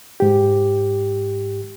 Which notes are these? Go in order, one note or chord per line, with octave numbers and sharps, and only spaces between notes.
G#2 G4